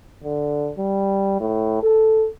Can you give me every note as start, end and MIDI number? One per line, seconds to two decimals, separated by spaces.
0.24 0.71 50
0.78 1.35 55
1.40 1.82 45
1.83 2.27 69